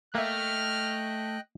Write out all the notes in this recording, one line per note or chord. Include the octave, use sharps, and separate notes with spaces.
A3 A#3 D#5 E5 G5 F6 F#6